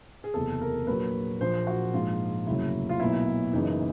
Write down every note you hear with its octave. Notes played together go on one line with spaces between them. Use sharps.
G#4
F#1 E2 C3 A4
A#4
A#1 A#2 F#3 A#3 B4
A#1 A#2 F3 A#3 C5
F#4
A#1 G#2 F3 F4
F1 D#2 C#3 F#3 E4
F4
B1 A#2 F#3 B3 E4
F#1 F#2 C#3 E3 D#4